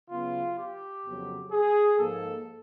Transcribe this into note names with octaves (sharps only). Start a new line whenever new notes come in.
C#3 F#3 B3 F4
G4
F2 C#3 F#3 B3
G#4
G#2 F3 A#3 A4